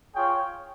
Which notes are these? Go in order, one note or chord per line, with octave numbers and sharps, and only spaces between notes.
F4 G#4 C#5 G5